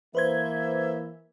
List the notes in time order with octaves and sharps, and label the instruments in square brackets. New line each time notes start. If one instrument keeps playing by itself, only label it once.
[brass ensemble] E3 A#3 [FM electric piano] B4 C5 G#6 [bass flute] E5